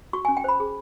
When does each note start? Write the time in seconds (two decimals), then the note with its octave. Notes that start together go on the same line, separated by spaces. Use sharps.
0.13 F#4 C#6
0.25 G#5
0.28 C#4
0.37 G5
0.44 C5 B5
0.60 G#4